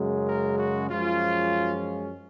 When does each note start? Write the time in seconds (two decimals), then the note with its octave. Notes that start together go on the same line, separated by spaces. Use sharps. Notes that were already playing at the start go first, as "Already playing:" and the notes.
Already playing: F#2 C#3 G#3
0.27 A#4
0.58 F#4
0.90 F#2 F3 G#3 C#4 F4